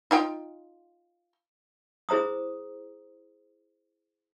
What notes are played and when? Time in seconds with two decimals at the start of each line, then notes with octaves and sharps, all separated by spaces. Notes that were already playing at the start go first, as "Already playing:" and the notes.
0.11 D#4 F4 G5
2.09 E4 G#4 C5 A#5 D#6